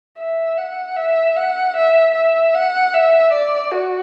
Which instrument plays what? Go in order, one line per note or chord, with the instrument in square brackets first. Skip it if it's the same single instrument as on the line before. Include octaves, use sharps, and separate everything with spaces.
[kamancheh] E5
F#5
E5
F#5
E5
E5
F#5
E5
D5
F#4